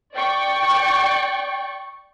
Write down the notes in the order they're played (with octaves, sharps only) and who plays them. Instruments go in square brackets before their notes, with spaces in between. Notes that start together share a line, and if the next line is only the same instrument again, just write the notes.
[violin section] D5 G5 C#6